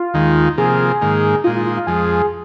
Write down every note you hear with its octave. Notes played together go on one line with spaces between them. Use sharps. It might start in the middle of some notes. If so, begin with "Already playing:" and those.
Already playing: F4
D#2 D#3 G#3
C3 F3 A#3 G#4
G#2 D#3 A#3
A#2 G#3 D#4 F4
F4
F4
F4
F2 F3 G#3 G#4